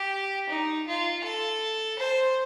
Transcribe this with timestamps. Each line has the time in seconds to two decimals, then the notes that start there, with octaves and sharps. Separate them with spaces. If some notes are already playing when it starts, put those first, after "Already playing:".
Already playing: G4
0.49 D#4
0.86 F4
1.24 A4
1.99 C5